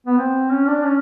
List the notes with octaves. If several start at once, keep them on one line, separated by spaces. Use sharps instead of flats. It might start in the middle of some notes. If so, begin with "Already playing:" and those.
B3
C4
C#4
D4
C#4